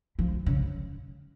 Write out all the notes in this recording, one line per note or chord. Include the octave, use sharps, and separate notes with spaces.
F3
C#3